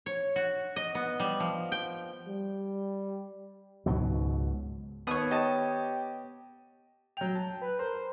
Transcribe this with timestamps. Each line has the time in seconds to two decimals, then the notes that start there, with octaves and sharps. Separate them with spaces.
0.06 C#5
0.36 F#4
0.76 D#5
0.95 B3
1.20 G3
1.40 F3
1.72 G5
2.28 G3
3.86 C#2 G#2 B2 F#3
5.07 D#2 B3 C#5 D#6
5.31 G4 D#5 A5
7.17 F#3 G5 F7
7.35 A5
7.62 B4
7.79 A#4 C5